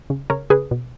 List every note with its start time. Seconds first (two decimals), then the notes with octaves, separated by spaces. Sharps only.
0.10 C#3
0.30 C#3 A#4 C#5
0.50 C#3 G#4 B4
0.71 B2